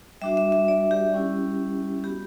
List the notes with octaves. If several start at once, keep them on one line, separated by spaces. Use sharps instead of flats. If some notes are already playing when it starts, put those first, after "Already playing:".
G3 D4 F#4 E5
E5
E5
D5
G4
G3 C#4 E4
B3 F#4 G4